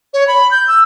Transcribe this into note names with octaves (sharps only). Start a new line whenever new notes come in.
C#5
B5
G6
E6